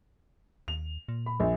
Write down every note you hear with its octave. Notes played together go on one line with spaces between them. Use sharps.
D#2 F7
A#2
B5
A#1